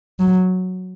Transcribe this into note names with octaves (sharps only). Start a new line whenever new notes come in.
F#3